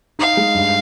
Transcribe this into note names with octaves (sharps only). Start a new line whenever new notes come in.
D#4 F5
G#3
G2